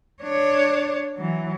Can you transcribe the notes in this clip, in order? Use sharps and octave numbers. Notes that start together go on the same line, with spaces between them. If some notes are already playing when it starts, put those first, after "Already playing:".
D4 C#5
E3 F#3